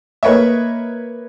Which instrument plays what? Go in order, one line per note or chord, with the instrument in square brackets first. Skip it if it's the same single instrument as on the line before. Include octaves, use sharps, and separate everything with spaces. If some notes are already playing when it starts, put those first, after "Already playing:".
[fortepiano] A#3 B4 C#5 D#5 E5